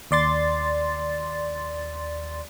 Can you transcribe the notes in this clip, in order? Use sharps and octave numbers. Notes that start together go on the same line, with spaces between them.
D#2 D5 C6 A6